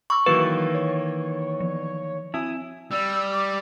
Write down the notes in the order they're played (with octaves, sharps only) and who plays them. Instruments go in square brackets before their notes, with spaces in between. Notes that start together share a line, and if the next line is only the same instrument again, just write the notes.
[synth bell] B5 D6 E6 [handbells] C#6
[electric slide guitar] D#3 E3 A#3 [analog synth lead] F#3 [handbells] B4 [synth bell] A6
[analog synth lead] C#5
[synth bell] F3
[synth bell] C4 G#5 [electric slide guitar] E4 [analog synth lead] D#6
[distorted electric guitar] G3 [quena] E6
[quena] D6